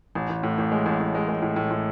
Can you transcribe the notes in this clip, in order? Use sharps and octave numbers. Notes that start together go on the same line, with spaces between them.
A1
A1
A2
A1
G#3
A1
A1
G#3
G#3
A2
A2
A2